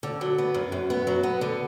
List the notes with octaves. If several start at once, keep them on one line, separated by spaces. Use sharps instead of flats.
D3
F#3
B3
F#2
F#2
B3
F#3
B3
D3